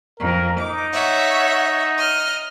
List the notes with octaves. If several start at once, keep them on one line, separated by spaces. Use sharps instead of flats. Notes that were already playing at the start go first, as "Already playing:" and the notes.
F2 A#4
D#4 D6
C#5 E5 F#5
D#5 F6